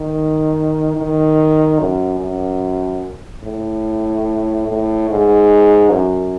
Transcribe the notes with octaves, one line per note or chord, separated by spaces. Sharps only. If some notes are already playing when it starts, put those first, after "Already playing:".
Already playing: D#3
D#3
F#2
F#2
A2
A2
G#2
F#2